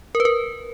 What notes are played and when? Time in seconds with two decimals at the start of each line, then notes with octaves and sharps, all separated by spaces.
0.15 A#4
0.20 B4
0.25 A#4